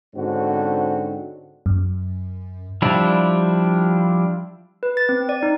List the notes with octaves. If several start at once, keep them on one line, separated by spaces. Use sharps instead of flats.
G#2 D3 C4 C#4 F#4
F#2
F3 G3 D4 E4
B4
A6
C4
D5
D#4